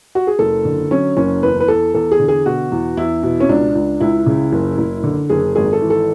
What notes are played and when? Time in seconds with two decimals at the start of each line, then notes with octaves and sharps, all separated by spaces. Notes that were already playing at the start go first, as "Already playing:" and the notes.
0.15 F#4
0.27 G#4
0.39 F#1 A4
0.65 D3
0.91 F#3 C#4
1.17 F#1 C#4
1.43 E2 B4
1.60 B4
1.68 E2 A4
1.94 E2 A4
2.11 G#4
2.20 D3
2.28 G#4
2.46 B2 F#4
2.72 E2
2.97 E2 E4
3.23 B2
3.40 C#4
3.49 C#2 D4
3.75 C#2
4.00 C#2 E4
4.26 C#3
4.52 F#1
4.78 F#1
5.04 D3
5.30 F#1 G#4
5.55 G#1 G#4
5.73 A4
5.81 E3
5.90 A4